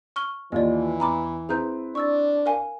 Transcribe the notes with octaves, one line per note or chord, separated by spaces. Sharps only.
C#6 F6 G7
D#2 E3 F4 G4 D5 D#5
E2 A#5 B5 D6
C4 E4 G#4 B4 A#5 G6
D4 C#6 E6 A6
A#4 F5 G#5